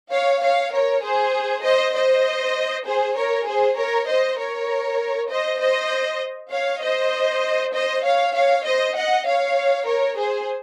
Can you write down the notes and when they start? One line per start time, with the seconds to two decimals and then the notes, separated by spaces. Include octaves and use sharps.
0.12 C#5 F5
0.42 C#5 F5
0.73 A#4 C#5
1.03 G#4 C5
1.64 C5 D#5
1.94 C5 D#5
2.86 G#4 C5
3.17 A#4 C#5
3.47 G#4 C5
3.78 A#4 C#5
4.08 C5 D#5
4.39 A#4 C#5
5.30 C5 D#5
5.60 C5 D#5
6.52 C#5 F5
6.82 C5 D#5
7.74 C5 D#5
8.04 C#5 F5
8.35 C#5 F5
8.66 C5 D#5
8.96 D#5 F#5
9.27 C#5 F5
9.87 A#4 C#5
10.18 G#4 C5